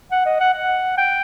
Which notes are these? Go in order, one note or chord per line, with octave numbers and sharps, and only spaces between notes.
F#5
D#5
F#5
F#5
G5